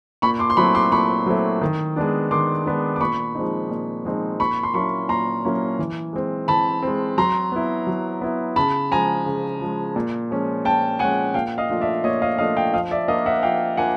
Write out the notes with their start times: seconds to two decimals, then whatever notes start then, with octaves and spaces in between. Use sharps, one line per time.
0.22 A#2 B5 C#6
0.39 C6 D6
0.50 C6
0.57 F#3 A3 C4 E4 B5 C#6
0.75 C6 D6
0.92 A#2 B5 C#6
1.26 F#3 A3 C4 E4
1.61 D#3
1.96 G#3 B3 D4
2.31 D#3 C6 D6
2.66 G#3 B3 D4
2.96 D6
3.01 A#2 B5 C#6
3.35 F3 G#3 C4 D#4
3.70 A#2
4.05 F3 G#3 C4 D#4
4.39 A#2 B5 C#6
4.63 C6
4.74 F#3 A#3 C#4 E4 B5 C#6
5.09 A#2 A#5 C6
5.44 F#3 A#3 C#4 E4
5.79 E3
6.13 G#3 C4
6.48 E3 A5 B5
6.82 G#3 C4
7.17 F#3 A#5 C6
7.52 B3 E4
7.87 F#3
8.21 B3 E4
8.56 C#3 A5 B5
8.91 F3 G#3 G#5 A#5
9.26 C#3
9.61 F3 G#3
9.96 A#2
10.30 F3 G#3 C#4
10.65 A#2 G5 A5
10.99 F3 G#3 C#4 F#5 G#5
11.34 A#2 F5 G5
11.58 D#5 F5
11.70 F3 A3 D4 F4
11.81 D5 E5
12.04 A#2 C#5 D#5
12.22 D#5 F5
12.38 F3 A3 D4 F4 D#5 F5
12.56 F5 G5
12.73 F3 D#5 F5
12.91 D5 E5
13.08 A#3 D4 F4 D#5 F5
13.26 E5 F#5
13.43 F3 F5 G5
13.77 A#3 D4 F4 F#5 G#5